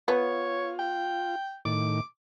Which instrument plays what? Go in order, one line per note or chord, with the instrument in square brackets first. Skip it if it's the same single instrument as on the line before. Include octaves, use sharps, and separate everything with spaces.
[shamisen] B3 [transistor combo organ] F4 [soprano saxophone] C#5
[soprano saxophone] G5
[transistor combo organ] A2 D#3 [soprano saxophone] D6